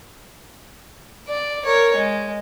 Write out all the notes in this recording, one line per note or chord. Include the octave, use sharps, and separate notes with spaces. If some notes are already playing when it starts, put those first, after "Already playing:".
D5
A#4 C#5
G#3